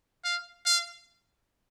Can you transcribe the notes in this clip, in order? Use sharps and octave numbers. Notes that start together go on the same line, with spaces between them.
F5
F5